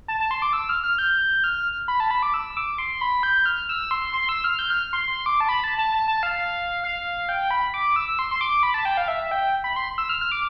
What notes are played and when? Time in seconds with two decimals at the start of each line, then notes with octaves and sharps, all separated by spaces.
0.08 A5
0.20 A5
0.31 C6
0.42 D6
0.53 E6
0.69 F6
0.84 F6
0.98 G6
1.44 F6
1.88 B5
2.00 A5
2.11 B5
2.23 D6
2.34 E6
2.57 D6
2.78 C6
3.01 B5
3.23 G6
3.46 F6
3.69 E6
3.91 C6
4.13 C6
4.29 E6
4.44 F6
4.59 G6
4.70 F6
4.93 C6
5.04 C6
5.26 D6
5.40 A5
5.49 B5
5.64 A5
5.78 A5
5.94 A5
6.08 A5
6.23 F5
6.84 F5
7.29 G5
7.51 B5
7.74 D6
7.96 E6
8.19 C6
8.31 C6
8.41 D6
8.63 B5
8.74 A5
8.85 G5
8.97 F5
9.08 E5
9.31 G5
9.64 B5
9.76 C6
9.98 E6
10.09 F6
10.21 F6
10.32 D6